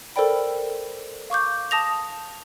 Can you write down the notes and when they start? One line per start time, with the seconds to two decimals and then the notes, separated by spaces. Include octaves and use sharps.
0.16 A4 A#4 C5 D5 G5 B5
1.30 F5 C#6 D6 G6
1.71 A5 D#6 A#6 F7